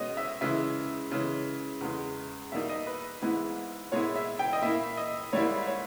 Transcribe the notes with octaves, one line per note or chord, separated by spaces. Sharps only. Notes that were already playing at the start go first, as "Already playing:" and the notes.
Already playing: B2 G#3 C#4 D#5
E5
C#3 E3 G#3 E5
C#3 E3 G#3 C#4
E2 C#3 G#3
B2 G3 A#3 D#4 E5
D#5
B4
G#2 E3 G#3 B3 E4
A#2 G#3 B3 E4 C#5
E5
G5
D#5
A#2 A#3 E4 E5
D#5
G#2 G3 A#3 E4 C#5
C#5